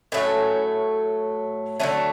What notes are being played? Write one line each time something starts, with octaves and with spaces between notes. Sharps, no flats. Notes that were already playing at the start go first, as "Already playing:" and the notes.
A2 F#3 A3 C#4
D3 F#3 A3 C#4